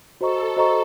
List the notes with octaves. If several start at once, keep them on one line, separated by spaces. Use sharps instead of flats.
F#4 A4 C5 D#5 A#5 C#6
F#4 C5 D#5 A#5 C#6